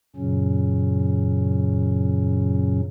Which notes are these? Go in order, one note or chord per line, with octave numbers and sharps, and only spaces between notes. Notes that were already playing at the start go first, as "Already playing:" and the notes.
F#2 A#2 C#3 F#3 C#4